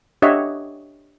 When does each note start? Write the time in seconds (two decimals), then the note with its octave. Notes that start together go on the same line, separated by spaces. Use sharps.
0.22 D4 G4 C#5 D#5 E5 F#5